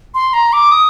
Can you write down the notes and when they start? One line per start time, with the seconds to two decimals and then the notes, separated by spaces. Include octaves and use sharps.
0.14 C6
0.33 A#5
0.53 D6
0.71 D#6